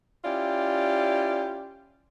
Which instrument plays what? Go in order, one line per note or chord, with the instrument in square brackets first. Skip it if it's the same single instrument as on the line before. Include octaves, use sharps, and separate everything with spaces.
[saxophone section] C#4 E4 F4 G4 D5